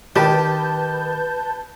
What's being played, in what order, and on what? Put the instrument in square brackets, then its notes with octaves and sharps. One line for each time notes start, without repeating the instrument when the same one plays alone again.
[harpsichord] D#3 [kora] G4 [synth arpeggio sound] B4 A5 G6